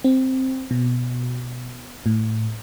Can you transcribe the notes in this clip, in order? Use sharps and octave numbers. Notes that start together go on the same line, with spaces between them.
C4
B2
A2